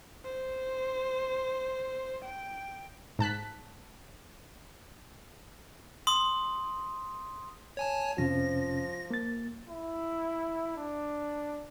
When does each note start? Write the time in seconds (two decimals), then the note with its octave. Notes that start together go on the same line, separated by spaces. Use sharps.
0.24 C5
2.24 G5
3.19 G#2 A5 F#6 B6
6.07 C6 D#6
7.77 C#5 G#5 A5
8.18 F2 C3 F3 C#4 A#6
9.10 A#3 A6
9.69 E4
10.77 D4